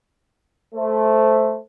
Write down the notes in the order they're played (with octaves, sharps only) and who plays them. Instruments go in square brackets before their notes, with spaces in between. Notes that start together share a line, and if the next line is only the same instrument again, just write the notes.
[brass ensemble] A3 C5